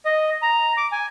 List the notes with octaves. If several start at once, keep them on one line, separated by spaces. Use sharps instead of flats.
D#5
A#5
D6
G#5